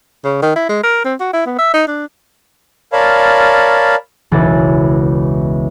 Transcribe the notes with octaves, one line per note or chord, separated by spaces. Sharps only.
C#3
D#3
E4
G#3
A#4
C4
F#4
E4
B3
E5
D#4
D4
A#4 C#5 D5 F5 A5 B5
E1 C#2 E3 G#4 A6